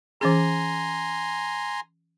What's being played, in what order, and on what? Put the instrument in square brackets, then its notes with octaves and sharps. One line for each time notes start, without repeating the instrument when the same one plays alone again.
[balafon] E3 C#4 G#4 [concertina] G#5 A#5 C6